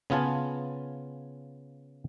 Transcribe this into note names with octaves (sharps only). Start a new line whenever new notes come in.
C#3 B3 F4 G#5 A5